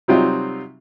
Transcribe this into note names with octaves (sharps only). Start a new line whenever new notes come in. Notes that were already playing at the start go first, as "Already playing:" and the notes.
C3 F#3 G3 C4 D#4 F4